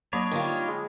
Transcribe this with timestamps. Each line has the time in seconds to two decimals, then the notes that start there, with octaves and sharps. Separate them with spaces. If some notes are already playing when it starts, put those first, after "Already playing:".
0.13 F#3 A#3 D4 C#5 D#5 B5
0.31 D3 D#3 G3 F4
0.68 G#3